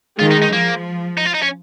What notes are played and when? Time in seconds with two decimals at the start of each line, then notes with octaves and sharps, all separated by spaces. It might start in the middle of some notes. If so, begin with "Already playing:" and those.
0.19 D#3 G#3 F4
0.31 D#4
0.42 D#4
0.53 F3 A#3
1.18 D#4
1.26 F4
1.34 D#4
1.42 C#4